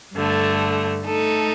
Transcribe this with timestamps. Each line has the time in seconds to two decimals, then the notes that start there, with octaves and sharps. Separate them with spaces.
0.15 G2 D3 A3
1.04 A3 D#4 A4